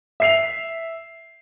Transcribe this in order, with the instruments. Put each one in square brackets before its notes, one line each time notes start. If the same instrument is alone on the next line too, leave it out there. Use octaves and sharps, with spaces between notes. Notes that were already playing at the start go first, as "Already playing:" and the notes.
[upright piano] E5 C7 F7